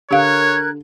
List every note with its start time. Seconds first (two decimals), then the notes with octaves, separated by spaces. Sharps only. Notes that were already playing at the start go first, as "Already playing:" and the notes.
0.11 D3 G4 A#4 C#5 F5 F#6 G#6